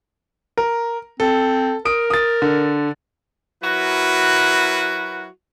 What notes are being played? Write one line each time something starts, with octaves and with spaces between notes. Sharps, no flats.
A#4
C4 A4
A#4 D#6 D7
D#6 A6
D3
F#3 E4 F#4 A#4 B4